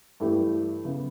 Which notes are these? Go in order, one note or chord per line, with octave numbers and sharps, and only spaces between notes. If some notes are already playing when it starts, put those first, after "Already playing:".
G2 E3 A3 E4 G4
C#3 E3 B3 E4